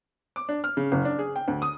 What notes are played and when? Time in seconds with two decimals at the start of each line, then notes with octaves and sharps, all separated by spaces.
0.36 D6
0.49 D4
0.64 F6
0.77 C#3
0.92 F#1
1.05 D4
1.19 G#4
1.36 G5
1.48 D2
1.62 D#6